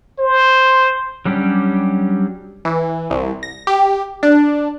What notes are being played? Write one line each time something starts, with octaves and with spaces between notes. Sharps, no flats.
C5
F#3 G3 C#4 D4 G4
E3
C2
A#6
G4
D4